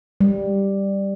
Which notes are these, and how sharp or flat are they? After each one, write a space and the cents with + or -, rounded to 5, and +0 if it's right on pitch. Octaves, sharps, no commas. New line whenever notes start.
G3 +5